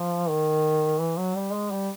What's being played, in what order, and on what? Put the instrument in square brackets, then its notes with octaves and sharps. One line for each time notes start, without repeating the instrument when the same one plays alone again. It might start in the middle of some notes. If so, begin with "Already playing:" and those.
Already playing: [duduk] F3
D#3
E3
F#3
G3
G#3
G3